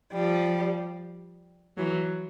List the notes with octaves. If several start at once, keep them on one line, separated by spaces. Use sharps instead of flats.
F3 G3
E3 F#3